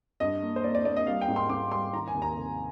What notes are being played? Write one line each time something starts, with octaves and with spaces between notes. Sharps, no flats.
G2 D#5
A#3
C5
A#3 D5
D5
A#3 D5
D#5
G3 F5
G5
G#2
C6
G#2 D6
G3 C6
D#3 A#5
G#5
D#2
A#5
F1